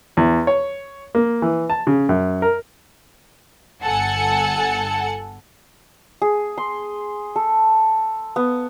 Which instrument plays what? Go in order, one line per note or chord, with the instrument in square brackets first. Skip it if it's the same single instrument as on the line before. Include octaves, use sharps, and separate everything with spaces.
[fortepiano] E2
C#5
A#3
E3
A5
C#3
F#2
A#4
[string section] G1 A4 F#5 G#5 C#7
[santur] G#4
C6
A4
B3